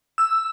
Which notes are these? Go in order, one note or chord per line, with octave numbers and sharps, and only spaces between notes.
E6